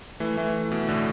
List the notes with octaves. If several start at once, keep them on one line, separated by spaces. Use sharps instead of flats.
E3 A3
E3 A3
B2
A2 D3